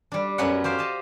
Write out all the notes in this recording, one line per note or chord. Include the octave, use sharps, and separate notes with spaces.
G3 D4
F#2 F#3 B3 C#4 F#5
G4 C5 F5
D#5 A5